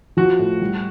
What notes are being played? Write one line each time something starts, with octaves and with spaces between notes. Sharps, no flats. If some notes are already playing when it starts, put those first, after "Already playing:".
F3 F#4
A2
G3